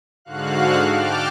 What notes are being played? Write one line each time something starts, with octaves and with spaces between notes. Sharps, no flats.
G#2 D3 F#4 F5 F#6
G5 A5 D6 F6